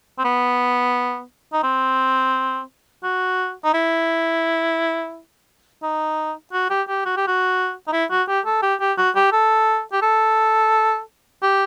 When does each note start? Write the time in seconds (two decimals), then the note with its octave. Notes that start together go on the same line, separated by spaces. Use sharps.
0.19 C4
0.24 B3
1.53 D#4
1.63 C4
3.04 F#4
3.65 D#4
3.74 E4
5.83 D#4
6.53 F#4
6.70 G4
6.88 G4
7.06 F#4
7.17 G4
7.28 F#4
7.88 D#4
7.93 E4
8.11 F#4
8.28 G4
8.46 A4
8.63 G4
8.80 G4
8.98 F#4
9.16 G4
9.33 A4
9.93 G4
10.02 A4
11.42 G4